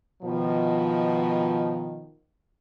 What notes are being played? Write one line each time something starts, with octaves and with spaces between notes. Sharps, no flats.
B2 D#3 F3